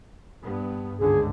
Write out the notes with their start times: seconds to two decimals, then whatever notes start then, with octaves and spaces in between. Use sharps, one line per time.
0.43 G2 B3
0.99 C#2 G#2 D3 G#4